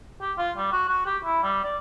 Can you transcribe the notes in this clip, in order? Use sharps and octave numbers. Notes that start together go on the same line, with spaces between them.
G4
F4
G3
F#4
F#4
G4
E4
G3
D5